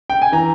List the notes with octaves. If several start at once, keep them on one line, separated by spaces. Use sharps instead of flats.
G5
G#5
E3 A#5